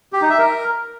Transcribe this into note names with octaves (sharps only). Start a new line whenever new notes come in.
G4
D#4
E5
A#4